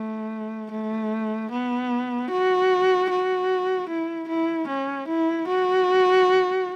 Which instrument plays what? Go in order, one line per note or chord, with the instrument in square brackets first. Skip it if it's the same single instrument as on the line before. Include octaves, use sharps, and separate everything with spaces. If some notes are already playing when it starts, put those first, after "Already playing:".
Already playing: [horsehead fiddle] A3
A3
B3
F#4
F#4
E4
E4
C#4
E4
F#4